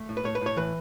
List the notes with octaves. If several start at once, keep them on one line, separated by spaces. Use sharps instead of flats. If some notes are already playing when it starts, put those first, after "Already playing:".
Already playing: A3
A2
B4
A2 C#5
B4
A2 C#5
E3 B4